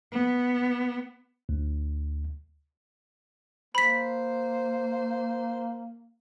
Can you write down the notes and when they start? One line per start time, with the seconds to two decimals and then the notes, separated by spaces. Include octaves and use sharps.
0.11 B3
1.49 D2
3.75 A#3 C5 B5 B6